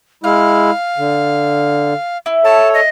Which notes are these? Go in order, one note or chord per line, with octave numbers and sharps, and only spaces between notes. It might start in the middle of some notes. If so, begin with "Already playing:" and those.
G#3 E4 F5 F6
D3
E4
A4 C#5 A5
D#5